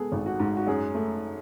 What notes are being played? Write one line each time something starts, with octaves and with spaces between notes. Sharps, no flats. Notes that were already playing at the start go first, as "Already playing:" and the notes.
Already playing: G#3 B3 G#4 A4
G#1
F#4
G#2
F#4
F#2 G#4
A3